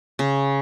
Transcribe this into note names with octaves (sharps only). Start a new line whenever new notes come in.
C#3